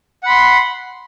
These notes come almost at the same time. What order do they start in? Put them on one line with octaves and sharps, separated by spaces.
F#5 B5 C6